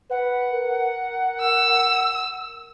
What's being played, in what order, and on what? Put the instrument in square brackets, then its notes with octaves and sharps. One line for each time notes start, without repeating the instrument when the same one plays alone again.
[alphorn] B4 [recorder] F#5
[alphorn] A#4
[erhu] E6